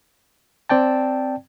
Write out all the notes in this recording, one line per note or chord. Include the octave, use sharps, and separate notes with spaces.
C4 D5 G5 A5